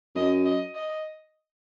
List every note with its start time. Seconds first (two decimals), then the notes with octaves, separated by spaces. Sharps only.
0.15 F#2 D#5
0.45 D#5
0.75 D#5